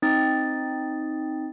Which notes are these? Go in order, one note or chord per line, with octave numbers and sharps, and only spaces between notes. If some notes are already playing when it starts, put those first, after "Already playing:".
C4 D#4 G5 D#6 A6